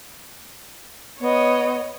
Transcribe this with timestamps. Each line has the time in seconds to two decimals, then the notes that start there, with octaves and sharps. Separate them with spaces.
1.20 B3 C#5 D#5